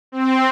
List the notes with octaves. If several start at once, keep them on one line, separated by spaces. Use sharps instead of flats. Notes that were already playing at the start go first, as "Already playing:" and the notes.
C4